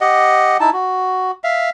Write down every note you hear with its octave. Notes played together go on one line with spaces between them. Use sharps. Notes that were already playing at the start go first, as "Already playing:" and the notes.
G4 D#5 F#5
D#4 E4 A5
F#4
E5 F5